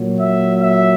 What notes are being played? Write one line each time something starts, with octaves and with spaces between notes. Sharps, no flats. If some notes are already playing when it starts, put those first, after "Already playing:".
Already playing: A#2 F#3
E5
E5